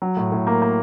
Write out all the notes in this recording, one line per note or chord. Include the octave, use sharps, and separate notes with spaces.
F#3
A2
A2
A#3
A#3